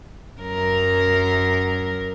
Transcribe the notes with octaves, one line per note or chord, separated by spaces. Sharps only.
F#2 A#4